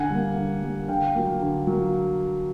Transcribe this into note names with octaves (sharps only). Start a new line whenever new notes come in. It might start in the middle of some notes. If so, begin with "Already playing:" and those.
Already playing: D3 F#5 G#5
G3 A#3
D3
G3 A#3
D3 F5 G5
F#3 A#3
D3
F#3 A#3